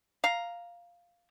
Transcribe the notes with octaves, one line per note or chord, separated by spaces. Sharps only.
F5 A#5